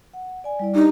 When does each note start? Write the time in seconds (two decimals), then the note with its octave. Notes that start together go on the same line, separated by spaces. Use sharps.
0.13 F#5
0.44 D5 G#5
0.59 G3 E4 D5
0.75 D4 D#4 G4